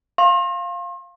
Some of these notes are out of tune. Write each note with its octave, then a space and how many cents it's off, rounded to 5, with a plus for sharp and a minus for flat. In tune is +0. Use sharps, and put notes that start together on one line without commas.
F5 +0 C6 +40